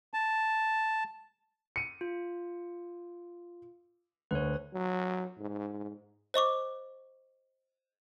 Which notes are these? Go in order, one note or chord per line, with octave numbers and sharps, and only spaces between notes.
A5
C#7 D#7
F4
D2 B4 C#5
F#3
G#2
C5 D#5 C#6 D6